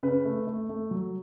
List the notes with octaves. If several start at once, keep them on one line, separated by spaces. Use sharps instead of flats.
C#3 B4
A3
A3
A3
F#3